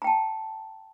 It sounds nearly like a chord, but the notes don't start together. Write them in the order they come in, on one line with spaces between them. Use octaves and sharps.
A#5 G5 A5